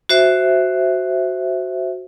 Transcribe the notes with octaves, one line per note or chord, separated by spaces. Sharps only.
F#4 C5 E5